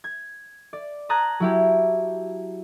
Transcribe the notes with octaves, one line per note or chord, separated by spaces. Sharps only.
G#6
D5
A5 A#5 D#6 F#6 G#6 A#6
F#3 E4 G4